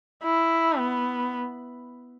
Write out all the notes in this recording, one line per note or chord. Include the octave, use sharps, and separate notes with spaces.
E4
B3